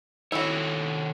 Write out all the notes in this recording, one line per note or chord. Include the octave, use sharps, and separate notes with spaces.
D#3 E4 F#4 A4 C#5